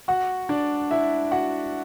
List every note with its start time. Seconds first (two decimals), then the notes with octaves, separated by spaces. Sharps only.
0.08 F#4 F#5
0.49 D4 D5
0.91 E4 E5
1.31 F#4 F#5